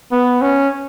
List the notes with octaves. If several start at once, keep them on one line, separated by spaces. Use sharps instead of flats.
B3
C#4